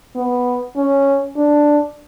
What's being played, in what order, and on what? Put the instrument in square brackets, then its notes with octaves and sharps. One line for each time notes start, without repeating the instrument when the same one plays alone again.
[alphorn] B3
C#4
D4